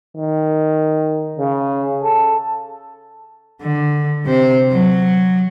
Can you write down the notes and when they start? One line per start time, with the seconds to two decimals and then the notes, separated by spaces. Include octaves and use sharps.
0.17 D#3
1.38 C#3
2.03 A4
3.61 D3
4.25 C3 C5
4.71 F#3